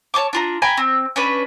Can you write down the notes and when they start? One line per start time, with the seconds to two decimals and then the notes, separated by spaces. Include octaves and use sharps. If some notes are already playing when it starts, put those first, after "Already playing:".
0.14 C#5 A5 C#6 D6
0.33 D4 F4 A#5
0.62 G5 G#5 A#5 B5
0.77 C4
1.16 C#4 D4 B4